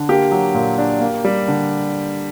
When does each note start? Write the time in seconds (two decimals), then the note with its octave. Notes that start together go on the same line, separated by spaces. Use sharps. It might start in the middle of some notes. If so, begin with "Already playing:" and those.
Already playing: D3
0.09 A#3 G4
0.31 F#3
0.54 A#2
0.78 D4
1.01 A#3
1.25 G3
1.48 D3